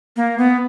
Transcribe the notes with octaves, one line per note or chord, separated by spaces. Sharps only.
A#3
B3